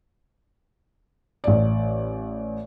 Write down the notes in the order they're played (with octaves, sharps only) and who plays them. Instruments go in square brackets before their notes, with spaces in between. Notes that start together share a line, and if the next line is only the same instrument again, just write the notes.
[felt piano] A1 D5